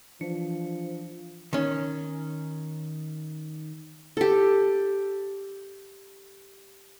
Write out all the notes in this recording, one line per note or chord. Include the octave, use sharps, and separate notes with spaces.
E3 F3 D4 C#7
D#3 C#4
G4 A4